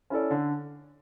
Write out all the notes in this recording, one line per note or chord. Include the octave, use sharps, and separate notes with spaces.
C#4 E4 A4 D5
D3